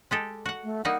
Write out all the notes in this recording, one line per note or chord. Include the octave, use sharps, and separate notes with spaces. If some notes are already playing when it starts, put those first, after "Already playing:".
G#3 G4 A4
F#4 F#5
A3
G3 A#3 D#4 F#5